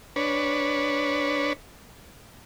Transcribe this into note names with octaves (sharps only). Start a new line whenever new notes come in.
D4 B4 C#5